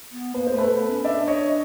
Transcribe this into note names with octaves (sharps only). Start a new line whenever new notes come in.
B3
A#3 B4
C5
A3
A4 B4
B3
C#4
D4 D5 E5
C#5 D#5